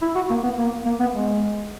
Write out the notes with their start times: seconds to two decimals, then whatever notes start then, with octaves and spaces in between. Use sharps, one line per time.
0.02 E4
0.15 F#4
0.29 A#3
0.43 B3
0.58 A#3
0.85 A#3
1.00 B3
1.13 G#3